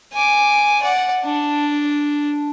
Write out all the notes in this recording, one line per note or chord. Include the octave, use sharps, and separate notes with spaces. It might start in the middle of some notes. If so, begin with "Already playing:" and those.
G#5 D6
D5 F#5
D4